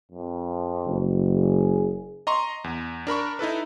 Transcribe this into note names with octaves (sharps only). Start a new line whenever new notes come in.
F2
F#1
G#4
D#5 A#5 C6 C#6
E2
D4 A#4 B5 C#6
D#4 E4 A4 B4